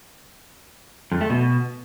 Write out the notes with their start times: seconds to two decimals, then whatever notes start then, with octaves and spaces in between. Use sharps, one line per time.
1.12 F2
1.21 A3
1.30 B2